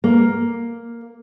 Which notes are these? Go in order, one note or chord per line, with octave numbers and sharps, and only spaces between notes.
A#3